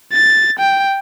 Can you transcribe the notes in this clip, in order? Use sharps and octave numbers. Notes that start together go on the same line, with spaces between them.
A6
G5